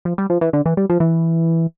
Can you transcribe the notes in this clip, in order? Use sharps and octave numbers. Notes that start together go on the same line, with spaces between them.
F3
G3
F3
E3
D3
E3
G3
F3
E3